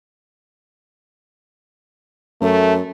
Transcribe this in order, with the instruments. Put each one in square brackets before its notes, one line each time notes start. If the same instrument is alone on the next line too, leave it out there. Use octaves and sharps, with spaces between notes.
[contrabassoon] F#2 [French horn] A3